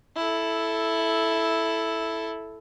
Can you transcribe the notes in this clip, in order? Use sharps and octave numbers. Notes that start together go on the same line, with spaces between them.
E4 A4